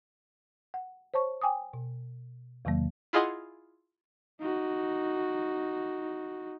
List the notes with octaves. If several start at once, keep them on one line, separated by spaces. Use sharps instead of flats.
F#5
C5 C#5 A5 C#6
G5 G#5 D6 D#6
B2
E2 C3 D#3 F#3 A#3
E4 F4 G#4 D#5 F#5 C6
D#4 F#4